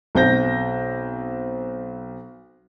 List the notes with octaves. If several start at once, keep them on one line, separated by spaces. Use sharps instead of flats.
B1 C4 G6 A#6